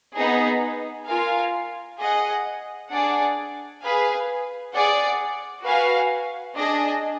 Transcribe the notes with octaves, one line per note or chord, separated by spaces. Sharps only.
B3 D#4 G#4
F4 A#4 F5 G#5
G#4 D#5 F#5
D4 G#4 D5 F#5
G#4 B4 F5 G#5
G#4 D5 F#5
F#4 B4 F5 G#5
D4 G#4 D#5